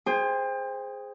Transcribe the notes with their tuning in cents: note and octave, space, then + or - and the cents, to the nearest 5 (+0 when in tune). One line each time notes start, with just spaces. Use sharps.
G#4 +0 C5 +0 G5 +35